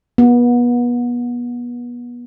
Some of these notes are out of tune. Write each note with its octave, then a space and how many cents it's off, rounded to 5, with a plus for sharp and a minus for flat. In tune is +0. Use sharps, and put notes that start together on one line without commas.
B3 -30